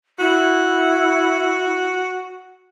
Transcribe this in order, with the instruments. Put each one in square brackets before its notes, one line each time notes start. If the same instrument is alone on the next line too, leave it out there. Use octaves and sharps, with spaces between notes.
[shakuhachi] E4 [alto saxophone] F#4